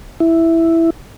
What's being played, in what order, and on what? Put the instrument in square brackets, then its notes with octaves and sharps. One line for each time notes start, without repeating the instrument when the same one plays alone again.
[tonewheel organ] E4